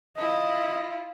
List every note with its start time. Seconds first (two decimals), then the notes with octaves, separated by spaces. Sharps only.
0.18 E4 F4 D#5